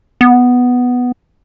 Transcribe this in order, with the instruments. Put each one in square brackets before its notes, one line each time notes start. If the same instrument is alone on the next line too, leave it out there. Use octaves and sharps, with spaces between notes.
[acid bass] B3